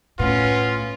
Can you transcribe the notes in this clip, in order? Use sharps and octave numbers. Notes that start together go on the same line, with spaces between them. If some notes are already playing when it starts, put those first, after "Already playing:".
A2 B3 C#4 F4